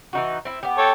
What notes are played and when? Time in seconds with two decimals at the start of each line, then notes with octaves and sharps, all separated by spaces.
0.13 E3 D#4 F#4
0.45 C4 E4
0.63 B3 G4
0.78 A4 C#5 G5